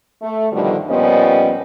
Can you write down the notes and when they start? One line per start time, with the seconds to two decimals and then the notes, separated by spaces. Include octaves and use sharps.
0.22 A3
0.52 G2 B2 D3 D#3 F3 G3
0.89 A#2 F3 G3 B3 C#4 D#5